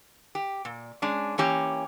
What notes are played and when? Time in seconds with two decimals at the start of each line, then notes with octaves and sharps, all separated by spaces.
0.35 G4
0.65 A#2
1.02 G#3 C#4 D4
1.38 E3 A#3 C#4 G4